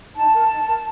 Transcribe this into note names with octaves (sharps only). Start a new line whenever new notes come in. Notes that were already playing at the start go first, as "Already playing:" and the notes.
D#4 A5
A#4
D#4
A#4